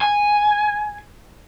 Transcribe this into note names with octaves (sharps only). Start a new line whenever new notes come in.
G#5